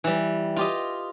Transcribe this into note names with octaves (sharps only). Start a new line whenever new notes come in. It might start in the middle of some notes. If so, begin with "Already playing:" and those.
E3 G3
F4 G4 D#5